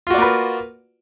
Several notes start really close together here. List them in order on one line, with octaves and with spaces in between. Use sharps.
F4 F#4 D5 A#3 B4